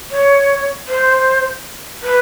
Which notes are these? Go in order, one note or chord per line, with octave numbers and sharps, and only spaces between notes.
C#5
C5
B4